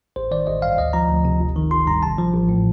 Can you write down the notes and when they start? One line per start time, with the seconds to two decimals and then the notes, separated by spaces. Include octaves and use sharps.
0.16 A1 C5
0.31 D#3 D5
0.47 A1 D#5
0.62 G2 F5
0.78 D2 D#5
0.93 F3 A#5
1.09 D2
1.25 C3
1.40 G1
1.56 D#3
1.71 G1 C6
1.87 G2 A#5
2.02 A1 A5
2.18 F3
2.34 A1
2.49 A2